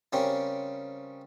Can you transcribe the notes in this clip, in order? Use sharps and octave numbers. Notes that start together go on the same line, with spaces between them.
C#3 G3 C4 C#4 A#4